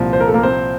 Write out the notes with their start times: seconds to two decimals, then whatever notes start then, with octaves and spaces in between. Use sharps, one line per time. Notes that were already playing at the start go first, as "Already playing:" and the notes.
Already playing: C2 A#2 F3
0.13 C5
0.21 A#4
0.28 A4
0.34 A#3 A#4
0.43 C4 C5